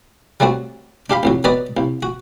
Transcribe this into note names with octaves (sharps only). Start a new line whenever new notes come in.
F#3 G3 A3 C4 F#4
D4 G4 F5 B5
C2 F2 F#3
F#3 B3 B4 D5 D#5
C2
F#4